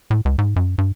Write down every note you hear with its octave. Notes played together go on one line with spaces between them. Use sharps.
A2
C#2
G#2
F#2
G2